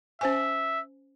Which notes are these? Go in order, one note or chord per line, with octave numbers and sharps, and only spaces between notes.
C#4 C5 E5 G#5